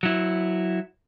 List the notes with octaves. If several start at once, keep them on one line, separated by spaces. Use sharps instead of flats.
F#3 E4